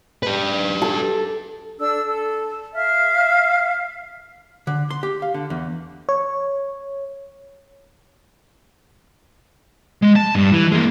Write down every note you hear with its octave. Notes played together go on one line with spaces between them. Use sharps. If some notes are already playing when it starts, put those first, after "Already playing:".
G4 B4
A4
D4 A4 E6
A4
E5 F5 F6
D3
C6
G4
F5
D3
E2
C#5
G#3
A5
G2
E3
G#3 A#3